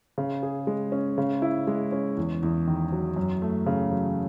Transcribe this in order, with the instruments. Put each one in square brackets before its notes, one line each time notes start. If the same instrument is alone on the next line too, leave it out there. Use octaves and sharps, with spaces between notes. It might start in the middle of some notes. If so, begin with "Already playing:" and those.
[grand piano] C#3
G#4
G#3
C#4
C#3
E4
G#3
C#4
E2
E2
D#3
F#3
F#2
A3
C#3
F#3